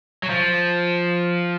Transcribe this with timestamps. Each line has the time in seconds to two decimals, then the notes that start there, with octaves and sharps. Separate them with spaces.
0.23 F#3
0.30 F3